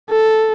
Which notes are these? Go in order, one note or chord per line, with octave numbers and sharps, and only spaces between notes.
A4